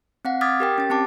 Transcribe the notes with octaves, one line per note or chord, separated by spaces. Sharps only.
C4 F5 F#5
D6 D#6 F6 G#6 A6 B6
G4 A#4 G5
C#4 A6
C4 G4 A5 D6